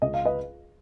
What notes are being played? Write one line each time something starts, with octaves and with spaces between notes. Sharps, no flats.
C#2 D#5
F5
B4 D#5